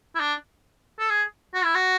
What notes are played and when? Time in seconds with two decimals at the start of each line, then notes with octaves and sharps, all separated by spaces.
0.15 E4
0.20 D4
0.99 A4
1.10 G#4
1.54 F#4
1.64 E4
1.75 F#4